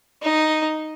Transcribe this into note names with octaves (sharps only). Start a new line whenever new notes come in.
D#4